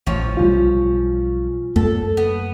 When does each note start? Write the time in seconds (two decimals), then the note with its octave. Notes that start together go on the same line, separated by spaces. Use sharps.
0.07 A1 F3 C#4
0.37 B1 G3 F4
1.76 F#2 A3 A#3 A4
2.17 B3